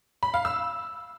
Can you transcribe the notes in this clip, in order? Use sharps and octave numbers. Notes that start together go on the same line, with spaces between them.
B5
F5
E6